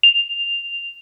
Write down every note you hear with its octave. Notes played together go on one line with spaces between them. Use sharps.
F7